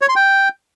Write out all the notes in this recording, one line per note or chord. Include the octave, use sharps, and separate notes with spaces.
C#5
C6
G5